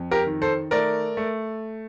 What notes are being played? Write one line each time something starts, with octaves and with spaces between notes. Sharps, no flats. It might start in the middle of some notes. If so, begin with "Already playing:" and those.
Already playing: F2
G4 A#4
D#3
A4 C5
A3 A#4 D5
A3